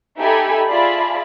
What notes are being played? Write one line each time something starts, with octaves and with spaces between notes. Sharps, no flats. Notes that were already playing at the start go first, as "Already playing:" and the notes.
D#4 G4 A4 E5 G#5 B5
F4 G#4 D5 E5 A5 B5